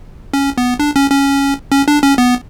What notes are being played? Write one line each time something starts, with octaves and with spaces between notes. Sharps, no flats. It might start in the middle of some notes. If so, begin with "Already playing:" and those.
C#4
B3
D4
C#4
C#4
C#4
D4
C#4
B3